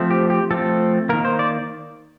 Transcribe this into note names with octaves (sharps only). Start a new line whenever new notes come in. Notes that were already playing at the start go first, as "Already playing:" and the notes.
Already playing: F3 A3 C4
G4
G4
F3 A3 C4 A4
D#3 A#3 A#4
C5
D5